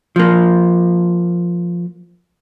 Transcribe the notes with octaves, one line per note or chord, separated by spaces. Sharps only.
F3 A#3